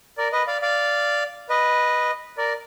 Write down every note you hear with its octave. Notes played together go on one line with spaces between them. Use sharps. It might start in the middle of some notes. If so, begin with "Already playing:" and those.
A#4 D5
B4 D#5
D5 F5
D5 F5
B4 D#5
A#4 D5